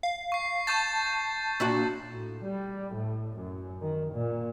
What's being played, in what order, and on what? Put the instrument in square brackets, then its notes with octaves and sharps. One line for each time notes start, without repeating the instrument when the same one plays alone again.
[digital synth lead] F5
[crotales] C#6 C7
[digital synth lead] A5 [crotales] C#6 G6 A6
[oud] A#2 D4 F#4
[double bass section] A2
G3
A2
F#2
D#3
A#2